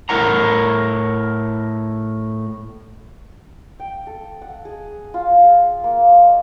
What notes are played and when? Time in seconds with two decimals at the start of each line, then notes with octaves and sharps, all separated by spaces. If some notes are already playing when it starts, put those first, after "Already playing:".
0.09 A2 E4 A#4 F#5 A#5
3.80 G5
4.07 A4
4.42 F#5
4.65 G#4
5.14 F4
5.44 G#4
5.84 A#3
6.12 D#5